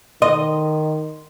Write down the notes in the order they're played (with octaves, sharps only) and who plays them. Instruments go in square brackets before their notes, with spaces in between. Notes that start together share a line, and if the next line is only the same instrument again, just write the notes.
[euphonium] D#3 [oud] D#5 [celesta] C6